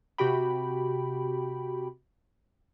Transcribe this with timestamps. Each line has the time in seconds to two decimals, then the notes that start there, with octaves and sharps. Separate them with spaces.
0.18 C3 F#4 G4 G5 B5